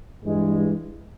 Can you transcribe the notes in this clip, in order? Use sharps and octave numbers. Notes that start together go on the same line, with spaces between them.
G2 E3 G#3